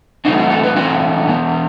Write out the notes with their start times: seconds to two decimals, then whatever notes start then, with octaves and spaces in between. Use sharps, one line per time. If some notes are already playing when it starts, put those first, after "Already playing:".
0.25 E3 A3 C4 D#4
0.38 F#4
0.50 A4
0.63 B4
0.76 E3 A3 C4 F#4
1.27 E3 B3